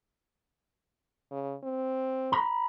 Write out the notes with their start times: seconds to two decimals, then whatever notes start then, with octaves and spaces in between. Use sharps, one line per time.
1.31 C#3
1.64 C4
2.32 A#5 B5